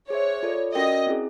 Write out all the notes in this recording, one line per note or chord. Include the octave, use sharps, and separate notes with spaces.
G#4 C5 C#5 E5
F4 A4 D5
C#4 F#4 A#4 D5 D#5 G5
C4 E4 G#4